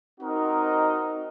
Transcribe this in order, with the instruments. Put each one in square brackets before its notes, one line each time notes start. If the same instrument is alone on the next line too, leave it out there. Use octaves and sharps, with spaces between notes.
[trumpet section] C4 D#4 F#4 A#4 D#5